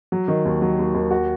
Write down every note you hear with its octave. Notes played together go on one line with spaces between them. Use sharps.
F#3
D#3
D#2
F#3
D#2
D#2
F#4